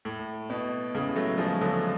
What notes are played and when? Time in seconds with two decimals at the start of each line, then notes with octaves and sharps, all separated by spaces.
0.05 A2
0.50 B2
0.95 A2 C#3
1.16 F#3 A3
1.38 F3 G#3
1.61 D3 F#3